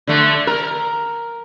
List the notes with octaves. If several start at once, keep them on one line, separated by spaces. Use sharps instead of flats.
D3 A3
A#4